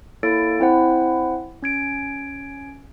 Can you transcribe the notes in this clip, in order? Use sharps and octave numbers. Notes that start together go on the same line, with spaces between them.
A#3 E4 A4 C#5 A6 D7
C4 E4 C5 F#5
C#4 G#6 D7